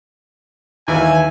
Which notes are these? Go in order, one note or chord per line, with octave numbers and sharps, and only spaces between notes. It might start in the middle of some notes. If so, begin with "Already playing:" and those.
D#2 E3 E4 G#5